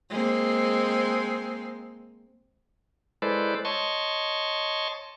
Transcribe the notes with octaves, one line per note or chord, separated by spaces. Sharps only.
G#3 A#3 C4
G#3 E4 A4 B4 C5 D5
C#5 D#5 A5 C6 C#6